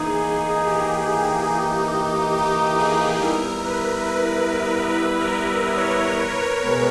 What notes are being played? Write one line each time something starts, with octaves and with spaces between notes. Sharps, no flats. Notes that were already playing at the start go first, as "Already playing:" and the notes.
Already playing: E3 A#3 D#4 G#4
G4
G4
G#4
G3 B3 E4 A#4
B4
B4
B4
A#4
C#5
B2 G#3 B3